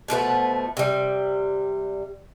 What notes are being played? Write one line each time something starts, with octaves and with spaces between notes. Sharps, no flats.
B2 F3 A3 B4
C3 G3